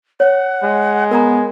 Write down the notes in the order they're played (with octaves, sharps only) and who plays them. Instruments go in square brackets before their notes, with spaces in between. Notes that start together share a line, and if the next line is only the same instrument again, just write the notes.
[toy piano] C#5 [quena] F#5
[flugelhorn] G#3
[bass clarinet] B3 [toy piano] A#4 A#5 [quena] G#5